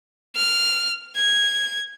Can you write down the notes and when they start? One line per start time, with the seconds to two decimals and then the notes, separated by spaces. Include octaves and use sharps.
0.36 F6
1.16 G#6